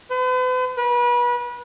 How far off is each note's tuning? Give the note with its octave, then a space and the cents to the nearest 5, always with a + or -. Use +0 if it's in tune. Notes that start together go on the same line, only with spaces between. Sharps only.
B4 +45
B4 -30